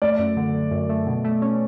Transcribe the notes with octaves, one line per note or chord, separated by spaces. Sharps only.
A3 D5
F#2
D3
D3
F#2
A3
B2
A3
C#4